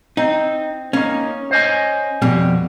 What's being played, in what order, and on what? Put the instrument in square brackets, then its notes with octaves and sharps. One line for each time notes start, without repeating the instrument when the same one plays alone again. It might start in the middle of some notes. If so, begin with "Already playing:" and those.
[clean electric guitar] C4 [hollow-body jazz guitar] D#4
[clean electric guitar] A#3 D#4 [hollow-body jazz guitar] C#4
[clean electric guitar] C5 D#5 G#5
[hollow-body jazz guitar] F2 B2 G3